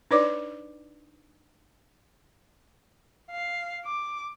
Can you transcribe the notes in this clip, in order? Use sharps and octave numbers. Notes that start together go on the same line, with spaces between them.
D4 D#4 B4 C#5 D5 D6
F5
D6